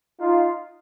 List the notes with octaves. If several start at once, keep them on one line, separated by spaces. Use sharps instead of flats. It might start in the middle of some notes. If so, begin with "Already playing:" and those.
D#4 F4